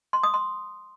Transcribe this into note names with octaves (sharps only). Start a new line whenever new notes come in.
C6
D#6
C6